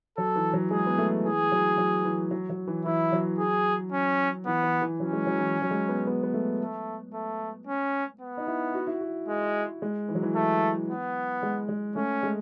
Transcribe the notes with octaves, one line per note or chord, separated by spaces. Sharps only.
F#3 A4
E3
F#3
G#3 G#4
B3
A3
E3 G#4
F#3
F#3
E3
F#3
F#3
E3
E3 E4
F#3
G#4
C#4
E3 B3
E3
E3
F#3 C#4
G#3
F#3
E3
F#3
G#3
B3
B3
B3
A3
A3
A3
C#4
B3
D#4
E4
F#4
E4
F#4
G#3
G#3
E3
F#3
E3
A3
B3
G#3
G#3
A3 C#4
G#3